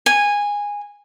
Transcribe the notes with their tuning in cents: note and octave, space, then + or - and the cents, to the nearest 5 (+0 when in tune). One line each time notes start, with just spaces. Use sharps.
G#5 -15